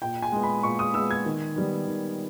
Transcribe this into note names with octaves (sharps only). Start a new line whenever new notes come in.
A#2 G5
G#5
G#3 B3
B5
A#2 C#6
D#6
G#3 B3 E6
G#6
D#3
G3 B3
D#3